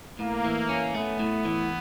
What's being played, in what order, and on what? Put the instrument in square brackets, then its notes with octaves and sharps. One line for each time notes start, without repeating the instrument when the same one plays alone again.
[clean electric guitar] A2 [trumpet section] A#3
[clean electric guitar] E3
C#4
[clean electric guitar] A3 [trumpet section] B3
[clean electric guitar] A2
E3